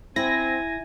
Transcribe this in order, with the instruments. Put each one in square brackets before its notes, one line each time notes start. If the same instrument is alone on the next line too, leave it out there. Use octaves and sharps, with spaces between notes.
[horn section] C4 [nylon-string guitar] E4 [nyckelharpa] G#5 [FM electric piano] A#6